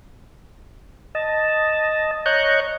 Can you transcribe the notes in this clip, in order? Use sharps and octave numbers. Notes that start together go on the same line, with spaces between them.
D#5 A5
C#5 D#5 A#5 C#6 F#6 G6